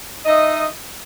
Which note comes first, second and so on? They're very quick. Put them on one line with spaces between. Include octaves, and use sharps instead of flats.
D#4 D#5 E5